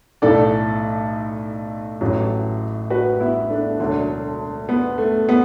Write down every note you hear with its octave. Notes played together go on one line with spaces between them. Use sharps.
B1 A2 E3 A4 D5
A1 A2 F#3
F#4 B4
B3 E4
A3 D4
E1 D2 D3 F#3 A3 D4
B3
A3
B3